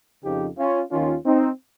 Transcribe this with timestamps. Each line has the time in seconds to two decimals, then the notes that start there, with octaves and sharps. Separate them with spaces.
0.23 F2 C#3 F3 D#4 G4
0.58 C#4 F4
0.92 D#2 D#3 C#4 F4
1.25 C4 D#4